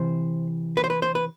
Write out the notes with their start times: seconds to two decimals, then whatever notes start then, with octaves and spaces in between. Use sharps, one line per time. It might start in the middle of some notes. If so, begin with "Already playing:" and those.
Already playing: C3 E3 C5
0.77 B4
0.84 C5
0.90 B4
1.02 C5
1.15 B4